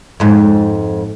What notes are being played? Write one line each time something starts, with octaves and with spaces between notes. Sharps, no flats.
F2 G#2